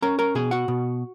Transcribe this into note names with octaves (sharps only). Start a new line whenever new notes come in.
C#4 A#4 A#5
A#4 A#5
B2 G#4 G#5
F#4 F#5
B2